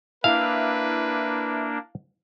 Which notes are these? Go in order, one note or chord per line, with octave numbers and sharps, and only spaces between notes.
A#3 D4 E4 B4 F5